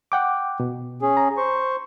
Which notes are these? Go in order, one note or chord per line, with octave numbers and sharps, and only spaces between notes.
F#5 G5 D6
B2
C#4 G#4
A#5
C5 C#6